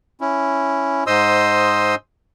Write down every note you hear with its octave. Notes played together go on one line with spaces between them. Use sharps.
C#4 E4
G#2 C5 D#5 C6 D#6 E6